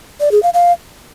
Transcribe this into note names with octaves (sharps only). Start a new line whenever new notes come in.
D5
G#4
F5
F5